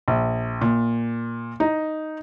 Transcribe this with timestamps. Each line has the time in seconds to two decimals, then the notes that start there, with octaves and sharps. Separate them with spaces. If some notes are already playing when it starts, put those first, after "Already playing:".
0.08 A#1
0.62 A#2
1.60 D#4